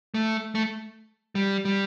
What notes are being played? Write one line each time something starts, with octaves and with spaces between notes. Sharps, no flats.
A3
A3
G3
G3